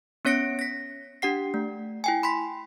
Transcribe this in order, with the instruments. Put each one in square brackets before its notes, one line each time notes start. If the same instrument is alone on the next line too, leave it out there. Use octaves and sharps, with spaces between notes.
[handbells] B3 C#4 C#5 A#6 C#7 D7
A#6 B6
D4 G4 F#5 C7
A3
E4 G5 G#5
B5 C6 B6